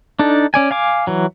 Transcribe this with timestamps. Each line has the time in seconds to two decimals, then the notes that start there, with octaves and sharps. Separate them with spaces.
0.19 D4 D#4 A4
0.54 C#4 D5 G#5
0.71 F5 G#5 D6
1.07 E3 F#3